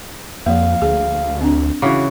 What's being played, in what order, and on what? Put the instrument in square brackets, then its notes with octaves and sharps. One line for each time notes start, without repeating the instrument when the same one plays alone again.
[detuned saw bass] F2 [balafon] F3 A#3 [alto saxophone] F5
[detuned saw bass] D2 [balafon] G#4
[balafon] C4 D4
[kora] C#3 E3 [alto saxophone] F#4 [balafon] D6